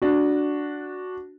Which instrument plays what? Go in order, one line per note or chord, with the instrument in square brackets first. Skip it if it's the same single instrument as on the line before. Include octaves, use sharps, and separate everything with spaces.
[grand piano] D4 F#4